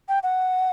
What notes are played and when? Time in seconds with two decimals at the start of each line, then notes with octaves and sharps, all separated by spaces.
0.08 G5
0.23 F#5